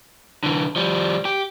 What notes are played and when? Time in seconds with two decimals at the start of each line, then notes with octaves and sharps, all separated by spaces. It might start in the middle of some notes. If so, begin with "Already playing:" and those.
0.43 D3 E3
0.76 F3 G3
1.25 G4